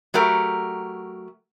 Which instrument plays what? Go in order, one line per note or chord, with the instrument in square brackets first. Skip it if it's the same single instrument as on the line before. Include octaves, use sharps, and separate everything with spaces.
[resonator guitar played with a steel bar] F#3 A3 G4 A#4